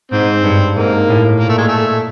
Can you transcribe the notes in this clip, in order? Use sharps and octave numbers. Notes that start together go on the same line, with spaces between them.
G#2 C4
G2
G#2 A#3
A2
A#2 A#3
A3
G#3
A3